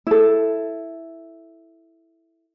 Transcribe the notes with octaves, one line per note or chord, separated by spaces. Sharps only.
E4 A4